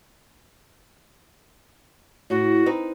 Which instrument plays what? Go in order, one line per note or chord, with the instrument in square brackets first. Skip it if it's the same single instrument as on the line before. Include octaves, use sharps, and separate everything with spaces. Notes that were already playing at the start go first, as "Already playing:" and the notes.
[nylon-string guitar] A2 [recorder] F#4
[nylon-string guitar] C4 D#4 B4